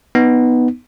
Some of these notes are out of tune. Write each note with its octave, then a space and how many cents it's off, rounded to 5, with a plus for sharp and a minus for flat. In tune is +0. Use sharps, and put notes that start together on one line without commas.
B3 +0 D#4 -5